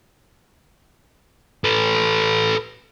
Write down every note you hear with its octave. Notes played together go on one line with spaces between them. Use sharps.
A4 B4